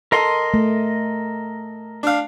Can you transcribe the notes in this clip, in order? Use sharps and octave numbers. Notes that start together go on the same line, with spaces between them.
A4 A#4 D#5 C6
A3
D4 F5